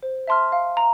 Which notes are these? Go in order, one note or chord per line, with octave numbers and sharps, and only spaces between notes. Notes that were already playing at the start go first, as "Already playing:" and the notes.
C5
E5 A5 C6 F6
F5
A#5